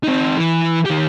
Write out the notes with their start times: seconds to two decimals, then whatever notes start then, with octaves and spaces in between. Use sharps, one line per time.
0.03 C4 D#4
0.37 E3
0.86 D#3 G4